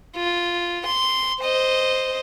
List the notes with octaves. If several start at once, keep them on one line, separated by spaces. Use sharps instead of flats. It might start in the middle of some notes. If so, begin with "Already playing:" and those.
F4
C6
C5 D#5